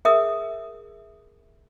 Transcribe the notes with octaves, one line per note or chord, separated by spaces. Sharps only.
G#4 A#4 E5 D#6